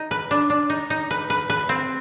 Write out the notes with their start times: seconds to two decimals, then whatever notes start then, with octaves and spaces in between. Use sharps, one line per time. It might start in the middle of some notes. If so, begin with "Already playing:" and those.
Already playing: D#4
0.11 B4
0.31 D4
0.50 D4
0.70 D#4
0.90 D#4
1.11 B4
1.30 B4
1.50 B4
1.69 C4